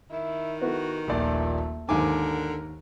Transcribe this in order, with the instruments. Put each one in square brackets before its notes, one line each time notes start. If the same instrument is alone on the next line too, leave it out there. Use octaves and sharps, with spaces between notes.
[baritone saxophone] D#3 [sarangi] E4
[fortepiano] B3 E4 A4 [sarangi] F#4
[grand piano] D#1 A#1 D5 [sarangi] A3
[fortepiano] D#2 G#2 [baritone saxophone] D3 [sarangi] A#4 [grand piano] G#5 D6